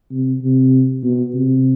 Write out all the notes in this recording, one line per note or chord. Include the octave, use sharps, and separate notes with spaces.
C3
C3
B2
C3